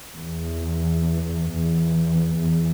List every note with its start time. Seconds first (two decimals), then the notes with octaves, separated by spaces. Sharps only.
0.19 E2
1.54 E2
2.43 E2